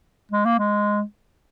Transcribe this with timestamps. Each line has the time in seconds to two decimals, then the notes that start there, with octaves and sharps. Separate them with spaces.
0.31 G#3
0.45 A#3
0.59 G#3